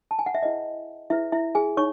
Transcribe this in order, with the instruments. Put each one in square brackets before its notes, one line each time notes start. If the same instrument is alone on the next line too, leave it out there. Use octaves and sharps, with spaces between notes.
[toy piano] A5
G#5
F#5
E5
E4 G#4 B4 D#5
E4 G#4 B4 E5
E4 E5
G#4 G#5
D#4 C#5 C#6